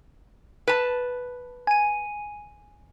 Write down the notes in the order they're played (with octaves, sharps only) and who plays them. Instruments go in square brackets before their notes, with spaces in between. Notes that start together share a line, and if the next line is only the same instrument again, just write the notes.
[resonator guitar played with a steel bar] B4 A5
[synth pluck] G#5 D#7